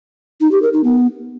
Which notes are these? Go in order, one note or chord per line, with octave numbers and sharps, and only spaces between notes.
D#4
G4
A#4
D#4
B3